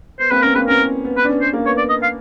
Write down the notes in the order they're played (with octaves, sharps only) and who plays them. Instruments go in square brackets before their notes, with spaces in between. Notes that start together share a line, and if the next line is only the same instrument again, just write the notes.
[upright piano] B3 [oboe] C5
[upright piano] A#3 C4 [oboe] B4
[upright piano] B3 C#4 [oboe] A#4
[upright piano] A#3 C4 [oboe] B4
[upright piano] B3 C#4 [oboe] A#4
[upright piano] B3
B3
[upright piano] B3 [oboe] B4
[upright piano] D4
B3 C#4
[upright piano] B3 [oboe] C5
[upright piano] A#3
[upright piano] B3 [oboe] C#5
[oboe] D5
D#5
F5